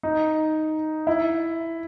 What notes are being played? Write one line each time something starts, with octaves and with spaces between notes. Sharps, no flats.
D#4
E4